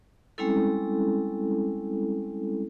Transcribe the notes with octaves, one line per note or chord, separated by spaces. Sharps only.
G3 G#3 C4 C#4 E4 A4